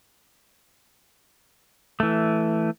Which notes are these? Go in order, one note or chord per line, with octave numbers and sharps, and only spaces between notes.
E3 A3